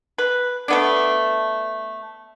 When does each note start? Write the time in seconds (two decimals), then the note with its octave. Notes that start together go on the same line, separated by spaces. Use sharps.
0.18 B4
0.68 A3 B3 D4